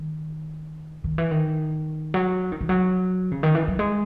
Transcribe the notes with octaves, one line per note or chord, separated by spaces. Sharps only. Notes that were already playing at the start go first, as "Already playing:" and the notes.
Already playing: D#3
D#3
E3
D#3
F#3
D#3
E3
F#3
C#3
D#3
E3
F#3
G#3